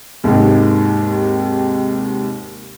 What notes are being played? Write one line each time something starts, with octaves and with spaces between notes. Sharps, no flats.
D#2 G#2 C3 D#3